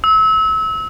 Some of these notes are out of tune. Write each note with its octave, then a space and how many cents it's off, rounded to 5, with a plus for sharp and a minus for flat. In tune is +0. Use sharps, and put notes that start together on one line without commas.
E6 -30